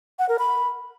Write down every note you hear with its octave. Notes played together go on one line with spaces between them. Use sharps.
F#5
A#4
B5